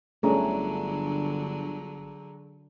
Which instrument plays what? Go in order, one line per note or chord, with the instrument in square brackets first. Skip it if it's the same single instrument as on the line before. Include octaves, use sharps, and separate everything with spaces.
[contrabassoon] G1 [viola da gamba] D3 F#3 [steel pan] A3 C#4 D4 [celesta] G#4 A#5